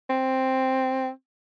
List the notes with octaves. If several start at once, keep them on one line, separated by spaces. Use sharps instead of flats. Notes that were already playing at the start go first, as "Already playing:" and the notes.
C4